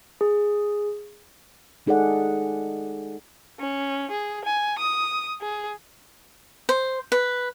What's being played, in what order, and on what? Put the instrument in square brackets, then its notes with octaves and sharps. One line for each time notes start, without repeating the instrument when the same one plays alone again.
[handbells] G#4
[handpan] G#3 D#4 G#4 A4 D5 F#5
[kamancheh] C#4
G#4
G#5
D#6
G#4
[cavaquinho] C5
B4